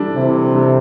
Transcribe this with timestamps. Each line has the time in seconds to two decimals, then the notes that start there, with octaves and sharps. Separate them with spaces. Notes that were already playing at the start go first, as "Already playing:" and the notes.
Already playing: E3 G3 D4 A4
0.16 C3 E3
0.54 G3 D4 A4